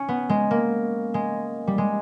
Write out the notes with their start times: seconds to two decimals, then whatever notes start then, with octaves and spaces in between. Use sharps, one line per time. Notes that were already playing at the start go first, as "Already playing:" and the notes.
Already playing: C#4
0.09 B3
0.29 G#3
0.51 A#3
1.14 G#3
1.67 G3
1.78 G#3